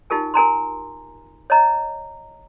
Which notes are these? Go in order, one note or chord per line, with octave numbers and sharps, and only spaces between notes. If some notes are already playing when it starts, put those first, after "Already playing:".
D#4 F4 G4 A#4 G#5
A#4 G#5 A#5 C6
C#5 D#5 A#5